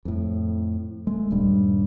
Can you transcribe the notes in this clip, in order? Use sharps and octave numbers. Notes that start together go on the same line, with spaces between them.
F2 A2
G#3 A3
D#1 G2 G3